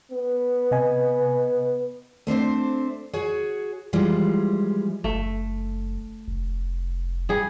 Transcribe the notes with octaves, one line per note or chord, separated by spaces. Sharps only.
B3
C3 D#5 G#5
A3 C4 D4 C5
F#4 G#4 C#5
E3 F3 G3 G#3
F#1 A3
F1
G3 G#4